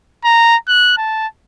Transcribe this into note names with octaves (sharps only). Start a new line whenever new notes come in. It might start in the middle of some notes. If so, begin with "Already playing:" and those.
A#5
F#6
A5